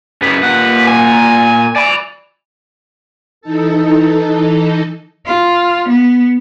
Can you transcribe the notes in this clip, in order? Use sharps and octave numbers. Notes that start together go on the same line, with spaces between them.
F#2 C#3 B4
A#2 F#5
G#5
D5 G#5 B5
E3 D#4 A4
F4
B3